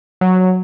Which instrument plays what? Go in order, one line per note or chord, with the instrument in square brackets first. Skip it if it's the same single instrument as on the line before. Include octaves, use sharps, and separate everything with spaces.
[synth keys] F#3